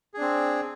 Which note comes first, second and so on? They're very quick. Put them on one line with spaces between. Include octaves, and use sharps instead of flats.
G#4 D4 C4